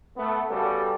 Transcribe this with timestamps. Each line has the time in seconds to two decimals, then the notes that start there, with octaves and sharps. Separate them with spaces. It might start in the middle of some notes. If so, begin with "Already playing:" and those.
0.17 A3 B3
0.49 C#3 G3 B3 F#4 A4